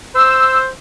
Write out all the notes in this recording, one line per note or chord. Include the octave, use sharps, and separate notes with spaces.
C5 E6